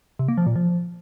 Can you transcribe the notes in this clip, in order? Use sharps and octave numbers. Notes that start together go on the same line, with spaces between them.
C3
A#3
F3
A#2
F3